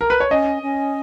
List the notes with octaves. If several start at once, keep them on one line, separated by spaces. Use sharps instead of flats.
A#4
B4
C#5
C#4 D#5
C#4